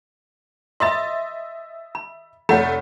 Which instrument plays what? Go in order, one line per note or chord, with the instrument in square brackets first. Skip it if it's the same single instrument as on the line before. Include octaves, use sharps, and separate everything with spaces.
[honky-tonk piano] D#5 E5 A6 [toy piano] B5 C6
[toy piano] B5
[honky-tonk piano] F1 A3 [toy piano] C#5 F#5 B5